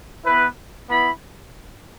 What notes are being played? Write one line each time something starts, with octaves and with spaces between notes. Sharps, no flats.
B3 E4 B4
B3 E4 B5